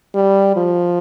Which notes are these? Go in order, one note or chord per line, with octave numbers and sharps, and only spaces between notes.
G3
F3